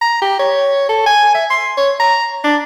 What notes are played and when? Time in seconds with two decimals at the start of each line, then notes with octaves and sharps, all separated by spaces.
0.01 A#5
0.22 G4
0.39 C#5
0.89 A4
1.06 G#5
1.35 E5
1.50 C6
1.77 C#5
2.00 A#5
2.44 D4